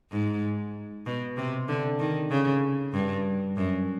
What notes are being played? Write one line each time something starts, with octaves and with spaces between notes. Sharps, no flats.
G#2
B2
C3
D3
D#3
C#3
G2
F#2